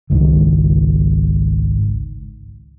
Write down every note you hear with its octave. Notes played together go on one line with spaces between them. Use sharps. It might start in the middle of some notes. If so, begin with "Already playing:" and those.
G#1 C#2 G#2 D#3